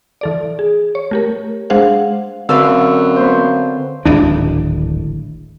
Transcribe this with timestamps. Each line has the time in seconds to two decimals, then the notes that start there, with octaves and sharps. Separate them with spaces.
0.21 E3 A4 D5
0.59 G#4
0.95 C#5
1.11 A3 G4 A#4
1.70 G#3 D4 G#4 C5 F5 F#5
2.49 F#2 D3 C4 B4 F5 E6
3.16 B3 C5
4.06 D1 G#1 E3 D4